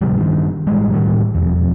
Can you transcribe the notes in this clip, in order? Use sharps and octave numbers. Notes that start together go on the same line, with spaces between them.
D1 C3 F3 G3
G2 D#3
A1 E3 G3 G#3
A2 D#3 E3 G3
E1 F2